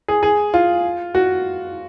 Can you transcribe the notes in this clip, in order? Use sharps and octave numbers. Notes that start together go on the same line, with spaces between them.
G#4
G#4
F4
F#4